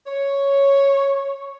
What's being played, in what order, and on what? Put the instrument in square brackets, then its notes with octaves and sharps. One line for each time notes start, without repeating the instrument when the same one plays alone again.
[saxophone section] C#5